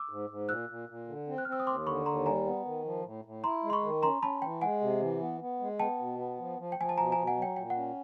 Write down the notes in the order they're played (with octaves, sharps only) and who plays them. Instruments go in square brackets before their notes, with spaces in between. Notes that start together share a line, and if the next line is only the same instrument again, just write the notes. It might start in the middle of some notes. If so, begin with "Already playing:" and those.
Already playing: [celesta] D6 E6
[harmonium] G#2
G#2
[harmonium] A#2 [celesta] E6 F#6
[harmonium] A#2
A#2
D3
C4
[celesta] F#6
F6
[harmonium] C4 [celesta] E6
[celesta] D#6
[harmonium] D#2 [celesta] C6 D6
[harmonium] D3 [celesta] B5 C#6
[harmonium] D#2 [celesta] A#5 C6
[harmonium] G3 [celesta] G#5 A#5
[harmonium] B3
D#3
F3
A2
A2
[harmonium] E4 [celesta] A#5 C6
[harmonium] G#3
[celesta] C6
B5 C#6
[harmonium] D#3
[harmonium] C#4 [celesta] A#5 C6
[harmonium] C#4 [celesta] A5 B5
[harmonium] E3 [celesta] G5
[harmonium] G#3 [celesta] F#5 G#5
[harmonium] C3
E3
B3
B3
G#3
[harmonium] B3 [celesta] G5 A5
[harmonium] B2
B3
F3
F3
[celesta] G5
[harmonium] F3 [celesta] G#5
[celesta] A5
[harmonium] B2 [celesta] G#5 A#5
[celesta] G#5 A#5
[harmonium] B2
[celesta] F#5 G#5
[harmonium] F#3
[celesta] G5
[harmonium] A#2 [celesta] G5
[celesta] F#5
[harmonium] C#4